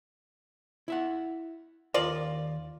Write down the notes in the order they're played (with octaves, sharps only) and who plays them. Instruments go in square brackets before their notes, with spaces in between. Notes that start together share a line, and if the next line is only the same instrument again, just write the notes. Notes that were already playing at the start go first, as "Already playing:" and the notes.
[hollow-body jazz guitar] E4 E5 F#5
[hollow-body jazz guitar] D#2 A#4 [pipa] F4 D5